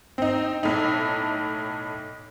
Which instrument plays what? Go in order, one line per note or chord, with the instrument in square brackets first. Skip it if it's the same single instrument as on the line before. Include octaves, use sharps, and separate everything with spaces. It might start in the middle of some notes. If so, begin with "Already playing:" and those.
[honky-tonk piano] C4 D#4
B1 A2 D#4